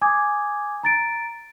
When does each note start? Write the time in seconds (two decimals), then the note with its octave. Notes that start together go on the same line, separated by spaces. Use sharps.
0.01 G#5 D6 D#6 G#6
0.83 A#5 A6 D7